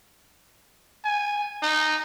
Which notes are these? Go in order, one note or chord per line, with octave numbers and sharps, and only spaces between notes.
G#5
D#4